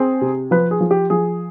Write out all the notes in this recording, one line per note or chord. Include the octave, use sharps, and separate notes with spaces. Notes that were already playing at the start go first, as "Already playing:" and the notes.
Already playing: C4 G#4
C3
F3 B4
G#4
F3
G4
F3 G#4